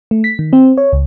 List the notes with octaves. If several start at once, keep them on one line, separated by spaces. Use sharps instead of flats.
A3
B6
D#3
C4
C#5
C#2